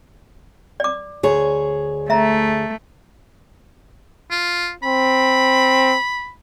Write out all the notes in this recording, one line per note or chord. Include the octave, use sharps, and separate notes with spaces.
D5 D6
D2 G#4 C#5
A3 E5 A#5
F4
C4 B5